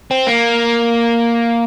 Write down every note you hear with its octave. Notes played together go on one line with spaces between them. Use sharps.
C4
A#3